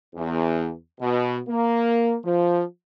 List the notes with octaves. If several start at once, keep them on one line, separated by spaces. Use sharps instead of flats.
E2
B2
A#3
F3